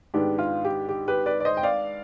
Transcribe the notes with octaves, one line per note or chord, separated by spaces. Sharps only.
G#2 D#3 B3 D4 G4
F4
G4
G4
G4 B4
B4 D5
D5
C5 D#5
G5
D5 F5